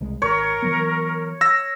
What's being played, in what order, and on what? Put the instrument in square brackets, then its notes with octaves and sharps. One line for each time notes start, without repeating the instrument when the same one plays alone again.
[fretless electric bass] C2 G#3
[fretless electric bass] G#1 [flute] A#4 [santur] C#5
[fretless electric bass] E3 F#3 B3
[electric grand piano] E6 A#6